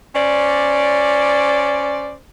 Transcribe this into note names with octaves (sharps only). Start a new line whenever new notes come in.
C#4 C5 D5